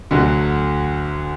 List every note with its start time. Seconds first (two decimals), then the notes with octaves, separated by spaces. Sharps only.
0.11 D2 D3 F#3